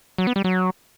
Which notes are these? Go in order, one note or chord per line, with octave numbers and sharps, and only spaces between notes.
F#3
B3
G3
F#3